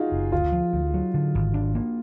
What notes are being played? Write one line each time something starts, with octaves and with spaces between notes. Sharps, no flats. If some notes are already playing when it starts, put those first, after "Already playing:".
Already playing: D#4 F4 F#4 G#4
F#1
D2 F4
F3
D2
F#3
D3
G#1
D4
A#3